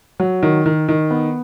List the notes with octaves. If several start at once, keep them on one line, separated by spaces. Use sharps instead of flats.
F#3
D#3
D#3
D#3
B3